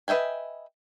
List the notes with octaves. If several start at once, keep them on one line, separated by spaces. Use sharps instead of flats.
B4 D#5 E5 G5 G#5